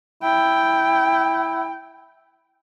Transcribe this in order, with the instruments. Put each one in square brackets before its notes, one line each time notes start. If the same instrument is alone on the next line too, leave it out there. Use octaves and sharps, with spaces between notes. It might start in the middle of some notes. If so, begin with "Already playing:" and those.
[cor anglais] E4 [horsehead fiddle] G5